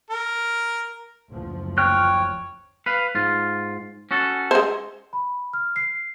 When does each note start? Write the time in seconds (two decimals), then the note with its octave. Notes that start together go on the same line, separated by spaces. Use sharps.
0.10 A#4
1.30 F#1 D2 F3
1.78 C#5 G5 F6 F#6
2.86 B4 F5
3.15 G#2 F4
4.11 C#4 F#4 A4
4.51 G#3 C5
5.13 B5
5.53 F6
5.76 C7